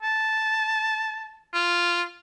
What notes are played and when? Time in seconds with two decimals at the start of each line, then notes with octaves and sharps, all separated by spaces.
0.03 A5
1.54 F4